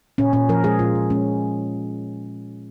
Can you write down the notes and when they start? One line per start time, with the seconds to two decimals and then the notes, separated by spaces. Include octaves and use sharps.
0.18 A#2 C#4
0.33 A#2 C#4
0.49 F3 A#4
0.64 G#3 G#4
0.79 A#2 F4
0.95 A#2
1.10 G#3 C#4